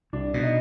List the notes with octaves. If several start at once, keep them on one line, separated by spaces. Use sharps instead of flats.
C2 D4
B2
D#4